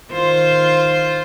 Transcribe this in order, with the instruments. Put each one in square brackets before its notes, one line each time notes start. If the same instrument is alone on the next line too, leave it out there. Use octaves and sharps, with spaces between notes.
[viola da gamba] D#3 F4 C5